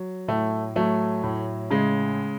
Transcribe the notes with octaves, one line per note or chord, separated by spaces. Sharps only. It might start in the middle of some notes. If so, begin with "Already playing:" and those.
Already playing: F#3
A2 A3
F#3 A3
A2
C#3 G#3